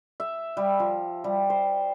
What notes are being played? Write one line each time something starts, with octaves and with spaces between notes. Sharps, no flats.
E5
G3
F3
G3
C5